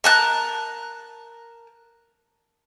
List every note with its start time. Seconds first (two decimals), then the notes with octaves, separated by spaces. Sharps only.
0.04 A#4 A5 F#6